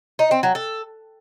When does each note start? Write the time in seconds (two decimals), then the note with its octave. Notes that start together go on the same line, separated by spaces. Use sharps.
0.19 D#4
0.31 C4
0.43 F#3
0.55 A4